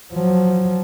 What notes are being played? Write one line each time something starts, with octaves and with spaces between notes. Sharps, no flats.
F3 F#3